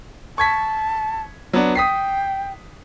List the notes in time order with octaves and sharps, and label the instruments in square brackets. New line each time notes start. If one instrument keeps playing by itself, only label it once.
[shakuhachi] A5 [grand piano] C#6 G#6 B6
[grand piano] F#3 B3 D4
[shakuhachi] G5 [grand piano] D#6 B6 C7